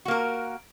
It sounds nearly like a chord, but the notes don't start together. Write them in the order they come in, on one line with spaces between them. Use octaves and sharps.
F#4 A#3 A#4